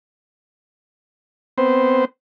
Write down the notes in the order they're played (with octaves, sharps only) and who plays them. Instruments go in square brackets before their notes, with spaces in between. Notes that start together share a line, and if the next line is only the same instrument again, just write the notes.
[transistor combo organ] B3 C4 C5